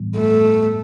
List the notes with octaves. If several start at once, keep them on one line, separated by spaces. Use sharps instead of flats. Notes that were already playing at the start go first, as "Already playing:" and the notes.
Already playing: A2 E3 G3 B3
A3